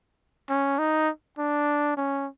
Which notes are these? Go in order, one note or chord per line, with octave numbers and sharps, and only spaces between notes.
C#4
D#4
D4
C#4